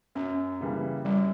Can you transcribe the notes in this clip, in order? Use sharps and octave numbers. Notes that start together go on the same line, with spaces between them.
F#2 C#4
C#3 E3 G3 A#3
F#2 G3